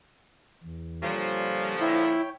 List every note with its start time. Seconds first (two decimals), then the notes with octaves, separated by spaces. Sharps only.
0.64 E2
1.02 A#2 D3 F3 G3 C#5
1.80 E4 C#5 G5